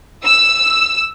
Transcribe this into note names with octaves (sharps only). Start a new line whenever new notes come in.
E6